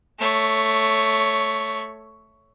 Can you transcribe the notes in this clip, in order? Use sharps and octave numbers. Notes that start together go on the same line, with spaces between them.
A3 C#5